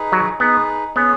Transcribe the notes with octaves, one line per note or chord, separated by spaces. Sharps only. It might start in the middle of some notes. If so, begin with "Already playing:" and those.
Already playing: D#4 G#4 B4
F#3
B3 D#4 G#4 B4
B3 C#4 G#4 C#5